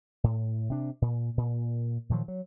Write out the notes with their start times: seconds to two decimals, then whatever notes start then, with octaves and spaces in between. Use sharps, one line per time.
0.24 A2
0.70 C3 D4
1.02 A#2
1.37 A#2
2.09 A#2 D#3 F3 F#3
2.28 F#3